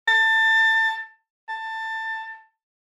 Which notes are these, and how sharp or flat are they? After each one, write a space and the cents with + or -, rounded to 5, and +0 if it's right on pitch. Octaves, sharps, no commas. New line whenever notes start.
A5 +25
A5 +20